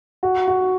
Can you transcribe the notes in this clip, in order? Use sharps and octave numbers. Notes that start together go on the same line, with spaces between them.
F#4
F#4